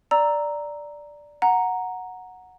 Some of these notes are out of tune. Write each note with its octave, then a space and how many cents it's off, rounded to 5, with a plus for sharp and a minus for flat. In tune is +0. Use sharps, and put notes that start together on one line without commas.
D5 +0 A#5 +0 E6 +0
F#5 -10 A#5 +0